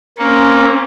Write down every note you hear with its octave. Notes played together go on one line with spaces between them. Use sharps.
A#3 C4 C#4